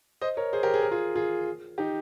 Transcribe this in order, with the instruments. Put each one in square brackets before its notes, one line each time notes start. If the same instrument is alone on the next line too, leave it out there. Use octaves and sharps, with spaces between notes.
[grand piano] C5 D#5
A#4 C#5
G#4 C5
G4 A#4
G#4
A#4
F4 G#4
F4 G#4
D#4 G4